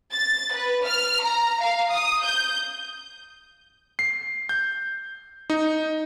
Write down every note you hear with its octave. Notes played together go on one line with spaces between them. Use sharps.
A6
B4
F6
A#5
F5
D#6
G6
C7
G6
D#4